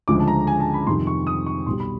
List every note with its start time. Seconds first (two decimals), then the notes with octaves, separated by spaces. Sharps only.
0.08 D2 C#3 F3 G#3 D6
0.19 A5
0.28 A#5
0.47 G#5
0.60 A5
0.74 B5
0.87 F2 C3 D#3 G3 C6
1.07 C#6
1.27 D#6
1.46 C#6
1.66 B1 B2 G3 C6
1.80 B5